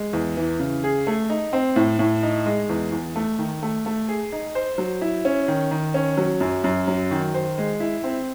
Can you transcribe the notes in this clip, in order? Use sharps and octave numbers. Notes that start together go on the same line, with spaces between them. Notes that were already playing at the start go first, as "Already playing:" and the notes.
Already playing: G#3
E2
E3
C#3
G#4
A3
D#4
C4
A2
A2
D#4
G#3
E2
E2
A3
D#3
A3
A3
G#4
D#4
C5
F#3
E4
C#4
D#3
D#3
C#4
F#3
F#2
F#2
F#3
D#3
C5
G#3
E4
C4